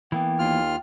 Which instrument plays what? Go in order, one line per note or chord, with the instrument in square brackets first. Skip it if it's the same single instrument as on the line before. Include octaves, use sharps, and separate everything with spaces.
[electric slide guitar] E3 A#3 B3 [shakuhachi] G5
[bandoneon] D#2 F4 F6